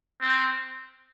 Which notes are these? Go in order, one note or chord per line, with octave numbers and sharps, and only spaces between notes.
C4